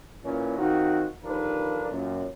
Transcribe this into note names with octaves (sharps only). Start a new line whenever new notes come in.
A#2 E3 C#4
D#3 C4 F4 F#4
D#2 D3 F3 D4 A#4 B4
F#2 A#2